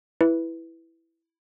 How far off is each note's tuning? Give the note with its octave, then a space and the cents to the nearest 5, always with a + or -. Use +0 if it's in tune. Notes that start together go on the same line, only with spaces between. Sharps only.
E4 +0 B4 +0